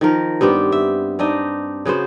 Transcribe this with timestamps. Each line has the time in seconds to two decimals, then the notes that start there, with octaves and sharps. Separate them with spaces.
0.01 D#3 F3 A#4
0.41 G2 B3 C4 G4
0.72 E5
1.19 C4 D4 D#4 D#5
1.85 C#3 B3 F#4 C5